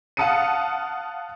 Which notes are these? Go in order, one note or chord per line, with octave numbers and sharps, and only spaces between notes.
F5 F#5 A5 D#6 C#7 D#7